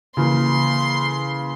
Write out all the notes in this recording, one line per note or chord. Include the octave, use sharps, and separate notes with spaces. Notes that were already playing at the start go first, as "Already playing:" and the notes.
C#3 E3 A#3 C6